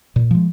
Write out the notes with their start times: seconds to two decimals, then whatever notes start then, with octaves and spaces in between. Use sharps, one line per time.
0.16 A#2
0.31 F3 G#3